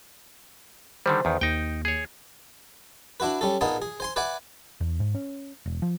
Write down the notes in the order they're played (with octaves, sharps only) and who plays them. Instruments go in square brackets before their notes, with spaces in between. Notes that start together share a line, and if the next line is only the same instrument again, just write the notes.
[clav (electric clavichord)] D3 D#3 G3 [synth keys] C5
[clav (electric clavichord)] E2 D#3
[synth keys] D#2 [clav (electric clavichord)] D#4 G5
[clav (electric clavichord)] G#4 C#5
[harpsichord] D4 E4 F#4 B4
G3 C#4 A4
A#2 B3 D#4 G#4 A5
G#4
C5 G#5 C6
B4 D5 E5 F#5 G#5
[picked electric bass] E2
G#2
C#4
E1
F3